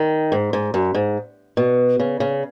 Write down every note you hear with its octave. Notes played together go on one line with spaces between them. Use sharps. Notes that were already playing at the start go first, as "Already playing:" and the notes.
Already playing: D#3
G#2
G#2
F#2
G#2
B2
C#3
C#3